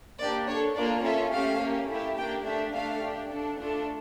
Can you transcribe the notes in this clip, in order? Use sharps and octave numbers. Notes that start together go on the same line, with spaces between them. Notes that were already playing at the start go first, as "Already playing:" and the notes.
A#3 D4 G4 D5
D4 A4 C#5
A#3 D4 F4 A4 D5
C#4 F4 A4 E5
A3 C#4 G4 F5
A#3 C#4 G4
A3 E4 G4
A#3 D4 G4 G5
A3 D4 G4 E5
A3 D4 A4 F5
D4 G4
D4 A4
A3 D4 F4 A4